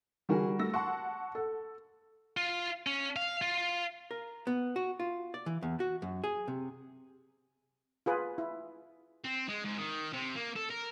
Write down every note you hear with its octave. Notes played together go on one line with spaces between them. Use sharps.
D3 E3 G3 F#4 G#4 A#4
A3 E6 A#6
F#5 A5 C6 C#6
A4
F4
C#4
F5
F4
A#4
B3
F#4
F4
D5
E3
E2
F#4
F#2
G#4
C3
F4 G#4 B4
E4
C4
G#3
G#2
D#3
C3
A#3
A4
A#4